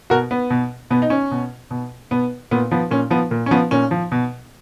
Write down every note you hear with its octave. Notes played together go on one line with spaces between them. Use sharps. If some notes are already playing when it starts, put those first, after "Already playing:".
B2 F#4 A#4
B3
B2
B2 B3
D#4
C#4
B2
B2
B2 B3
A#2 B3
F3 B3
A#2 C#4
F3 B3
A#2
C#4
F3 B3
A#2 C#4
F3
B2